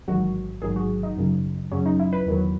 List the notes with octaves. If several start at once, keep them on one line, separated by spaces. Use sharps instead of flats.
A1 G#2 D#3 F#3 F#4
A1 G#2 D#3 F#3 G#4
F#4
D#4
F#2 C#3 F#3
F#2 C#3 F#3 C#4
D#4
E4
B4
E2 D#3 F#3